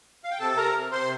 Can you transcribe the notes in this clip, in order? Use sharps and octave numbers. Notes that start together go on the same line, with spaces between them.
F5
G5
C3 A4 A5
C3 A#4 A#5
C3
C3 C5 C6